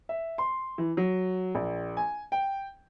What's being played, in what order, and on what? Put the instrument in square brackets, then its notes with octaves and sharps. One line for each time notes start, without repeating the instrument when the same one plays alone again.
[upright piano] E5
C6
E3
F#3
A#1
G#5
G5